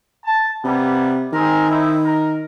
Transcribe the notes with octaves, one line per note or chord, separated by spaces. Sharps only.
A5
C3 G3 A#3 B3
D#3 C4 G#4 A#4
C4 D#4 E4
A#4